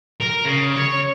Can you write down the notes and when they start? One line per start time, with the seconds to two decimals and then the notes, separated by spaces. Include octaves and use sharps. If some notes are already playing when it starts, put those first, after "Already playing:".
0.20 A#4
0.45 C#3
0.76 C#5